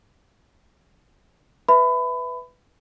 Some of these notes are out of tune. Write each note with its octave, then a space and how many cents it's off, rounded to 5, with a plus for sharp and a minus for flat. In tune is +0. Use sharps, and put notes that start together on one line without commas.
B4 +5 E5 -5 B5 +25